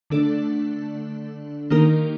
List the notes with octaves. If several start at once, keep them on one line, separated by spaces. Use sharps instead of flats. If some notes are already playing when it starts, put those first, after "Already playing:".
D3 A3 D4 A4 D5
D#3 A#3 D#4 G4 A#4